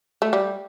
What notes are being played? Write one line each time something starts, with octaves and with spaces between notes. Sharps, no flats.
A3
G3